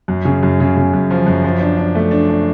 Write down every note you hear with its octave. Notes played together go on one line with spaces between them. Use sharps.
F#2
C#3
F#2
C#3
C#3
F#2
F3
F#2
F3
D4
D4
A3
D4
D4